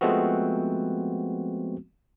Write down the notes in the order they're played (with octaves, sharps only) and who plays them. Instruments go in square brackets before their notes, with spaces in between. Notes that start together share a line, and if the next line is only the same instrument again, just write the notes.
[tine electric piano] F3 G#3 A3 B3 C4 F#4